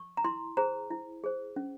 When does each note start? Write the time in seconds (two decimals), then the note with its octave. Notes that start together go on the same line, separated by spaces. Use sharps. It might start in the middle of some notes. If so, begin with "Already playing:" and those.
Already playing: C#6
0.17 A#5
0.24 E4 C6
0.57 G#4 C5 A#5
0.91 E4
1.24 G#4 C5
1.56 C#4